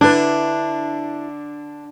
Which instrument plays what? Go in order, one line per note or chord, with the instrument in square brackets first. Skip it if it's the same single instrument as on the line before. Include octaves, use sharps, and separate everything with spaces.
[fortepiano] D3 [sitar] D4 [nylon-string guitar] E4 B4